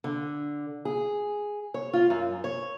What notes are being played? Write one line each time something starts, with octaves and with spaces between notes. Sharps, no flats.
D3
G#4
C#5
F4
F#2
C#5